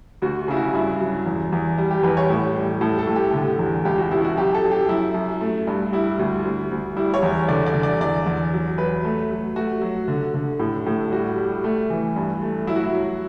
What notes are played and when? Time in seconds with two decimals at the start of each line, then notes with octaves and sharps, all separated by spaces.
0.22 D2 F#4
0.48 C#3 E4
0.57 F#4
0.74 G2 E4
1.00 F#3
1.26 E2
1.52 E2
1.78 G3
1.91 G4
2.03 E2 B4
2.17 C#5
2.30 A2
2.56 G3
2.81 A2 A4
2.98 A4
3.07 A2
3.16 G4
3.33 D3
3.59 E2
3.85 C#2 G4
3.98 F#4
4.11 B2 E4
4.24 F#4
4.37 F#2 G4
4.54 A4
4.63 F#3
4.71 G4
4.89 F#2 E4
5.14 F#2
5.41 A3
5.67 G2
5.93 G3 E4
6.19 D2
6.44 D2
6.71 D2
6.96 G3 E4
7.14 C#5
7.22 E2
7.48 D3 D5
7.66 D5
7.74 D3
7.83 D5
8.00 E2 D5
8.26 E2
8.53 F#3
8.78 F#3 B4
9.04 A3
9.30 F#3
9.56 A3 F#4
9.82 F#3
10.08 D3
10.34 D3
10.59 A2
10.86 A2
11.11 G3 F#4
11.38 G3
11.64 A3
11.90 E3
12.16 G2
12.42 A3
12.67 F#3 E4
12.76 F#4
12.84 E4
12.94 F#3